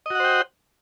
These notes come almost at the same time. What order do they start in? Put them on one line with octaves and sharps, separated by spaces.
D#5 F#4 F#5 C5 G5